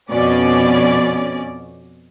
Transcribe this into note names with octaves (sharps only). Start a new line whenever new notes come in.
F2 B2 C#4 D5